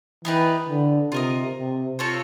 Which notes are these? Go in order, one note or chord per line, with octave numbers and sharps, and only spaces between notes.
E3 B3 D#4 G4 B4
D3
C3 F4 A#4 D#5
C3
C4 F4 A4 C#5